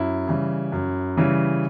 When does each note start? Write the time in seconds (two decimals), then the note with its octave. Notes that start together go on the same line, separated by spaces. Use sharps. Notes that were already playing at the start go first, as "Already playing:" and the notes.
Already playing: F#2 E4
0.27 C#3 E3 G3
0.72 F#2
1.17 C#3 E3 G3